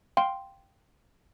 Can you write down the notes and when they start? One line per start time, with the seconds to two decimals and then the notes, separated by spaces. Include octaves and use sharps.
0.17 F5 G5 C6